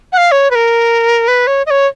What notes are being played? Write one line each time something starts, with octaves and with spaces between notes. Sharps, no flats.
F#5
F5
C#5
B4
A#4
B4
C#5
D#5
C#5